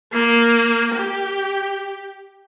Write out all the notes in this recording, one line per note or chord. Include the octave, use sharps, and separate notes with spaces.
A#3
G4